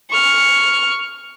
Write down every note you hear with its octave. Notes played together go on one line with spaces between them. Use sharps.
C#6 F6